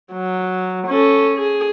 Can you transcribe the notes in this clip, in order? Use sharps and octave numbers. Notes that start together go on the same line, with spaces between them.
F#3
C#4 A4
G#4